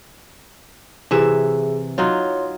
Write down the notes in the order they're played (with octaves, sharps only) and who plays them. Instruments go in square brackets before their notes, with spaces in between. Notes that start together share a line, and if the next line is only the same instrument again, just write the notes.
[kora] C3 E3 E5 [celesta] G#4
[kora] F#3 D#4 F4 [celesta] C#5 C6